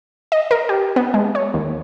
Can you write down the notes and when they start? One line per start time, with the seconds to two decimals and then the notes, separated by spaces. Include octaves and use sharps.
0.32 D#5
0.51 A#4
0.69 G4
0.96 B3
1.14 G#3
1.35 C#5
1.54 D#2